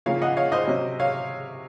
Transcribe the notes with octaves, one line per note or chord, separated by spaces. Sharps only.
C#3 F3 A#3 C#4 C#5 F5
D#5 F#5
C#5 F5
C5 D#5
C3 F#3 C#4
C#5 F5